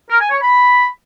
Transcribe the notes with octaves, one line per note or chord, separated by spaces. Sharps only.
A#4
G#5
C#5
B5